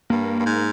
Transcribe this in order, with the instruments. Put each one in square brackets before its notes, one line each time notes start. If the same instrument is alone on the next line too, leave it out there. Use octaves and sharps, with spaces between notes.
[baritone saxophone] G2 [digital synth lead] A#3
[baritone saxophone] G2
G#2